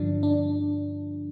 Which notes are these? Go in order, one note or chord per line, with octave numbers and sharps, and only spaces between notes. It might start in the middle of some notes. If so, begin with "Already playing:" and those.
Already playing: G2 D3 F3 D4
D4